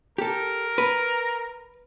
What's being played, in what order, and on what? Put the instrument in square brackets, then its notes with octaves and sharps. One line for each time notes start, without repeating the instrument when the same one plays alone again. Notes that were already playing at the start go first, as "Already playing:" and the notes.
[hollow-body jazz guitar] G4 A4 [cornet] A#4
[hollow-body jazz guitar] B4